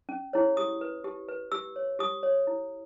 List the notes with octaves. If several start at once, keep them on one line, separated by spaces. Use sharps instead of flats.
C#4
E4 G#4 C#5
G4 D#6
B4
G4
B4
G4 E6
C#5
G4 D#6
C#5
E4